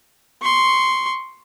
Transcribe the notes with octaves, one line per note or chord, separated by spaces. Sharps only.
C6 C#6